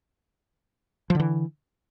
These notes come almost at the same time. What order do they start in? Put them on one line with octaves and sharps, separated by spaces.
F3 D3 E3